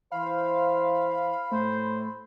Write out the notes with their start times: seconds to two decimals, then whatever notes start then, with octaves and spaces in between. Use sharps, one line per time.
0.12 E3 C5 F5 B5
1.52 A2 A3 C5